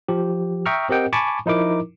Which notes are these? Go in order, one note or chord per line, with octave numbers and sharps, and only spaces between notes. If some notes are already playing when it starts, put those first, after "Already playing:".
F3 G4
E5 G5 A#5 C#6 D#6 F6
C4 G4 A#4 D#5 F#5 G5
G#5 A5 B5 C#6 D6
F3 D#4 E4 A#4 D6